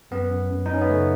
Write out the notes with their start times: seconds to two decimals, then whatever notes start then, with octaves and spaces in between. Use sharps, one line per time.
0.11 F#2 B3
0.31 F#2
0.51 F#2
0.66 D#4
0.70 F#2 C#4
0.81 B3
0.89 C#3 A3